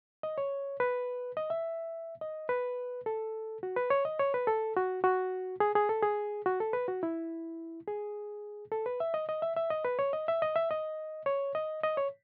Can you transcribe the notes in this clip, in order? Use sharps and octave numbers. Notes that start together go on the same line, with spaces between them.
D#5
C#5
B4
D#5
E5
D#5
B4
A4
F#4
B4
C#5
D#5
C#5
B4
A4
F#4
F#4
G#4
G#4
A4
G#4
F#4
A4
B4
F#4
E4
G#4
A4
B4
E5
D#5
D#5
E5
E5
D#5
B4
C#5
D#5
E5
D#5
E5
D#5
C#5
D#5
D#5
C#5